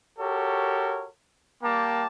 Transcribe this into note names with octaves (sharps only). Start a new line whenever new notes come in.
F#4 G4 A4 A#4 C#5
G3 A#3 G5 A5 D6